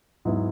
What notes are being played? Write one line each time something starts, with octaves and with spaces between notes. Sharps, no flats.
G#2 F#3 B3 E4